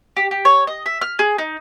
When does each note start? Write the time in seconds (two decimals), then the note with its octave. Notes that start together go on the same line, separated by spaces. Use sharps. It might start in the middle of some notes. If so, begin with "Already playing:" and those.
0.17 G4
0.31 G4
0.45 C#5
0.67 D#5
0.86 E5
1.02 F6
1.19 G#4
1.38 D#4